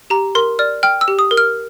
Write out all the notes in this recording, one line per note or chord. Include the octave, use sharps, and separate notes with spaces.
G4 A#5
A#4 C6
D5 F6
G5 F6
E6
G4
D#6
A#4
F6